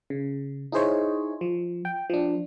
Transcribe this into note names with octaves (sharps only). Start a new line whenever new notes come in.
C#3
D#4 E4 G#4 C5 C#5 D#5
F3
G5
F3 D4